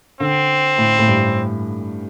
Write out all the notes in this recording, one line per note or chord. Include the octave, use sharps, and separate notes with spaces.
D3 C4
A2
A2
G2